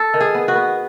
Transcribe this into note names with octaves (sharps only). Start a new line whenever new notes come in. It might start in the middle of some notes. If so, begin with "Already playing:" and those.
Already playing: A4
D#3
G#4
B3
F#4
B3